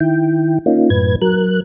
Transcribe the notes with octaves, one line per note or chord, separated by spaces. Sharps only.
D#3 E4 G5
A#3 C#4 D#4 F4
F#2 A2 B4 G#6
F#3 A#4 F#6